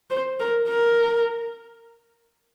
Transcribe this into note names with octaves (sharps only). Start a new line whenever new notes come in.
C5
A#4
A#4